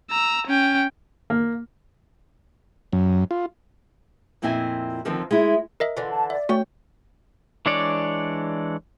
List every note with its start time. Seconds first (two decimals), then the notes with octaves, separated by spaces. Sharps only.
0.10 A#5 E6
0.47 C#4 G5
1.30 A#3
2.93 F#2
3.31 F4
4.42 F2 A#2 C4 E4 D#5 G#5
5.05 D3 D#3 F3 C4
5.31 G#3 E4
5.80 A#4 D#5 E5
5.97 D3 E3 F4
6.11 A5
6.30 D5 E5
6.49 A3 C#4 F#4 G5
7.66 E3 G#3 D4 C#5 D5